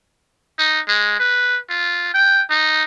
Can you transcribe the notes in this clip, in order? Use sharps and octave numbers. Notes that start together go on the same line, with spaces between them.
D#4
G#3
B4
F4
G5
D#4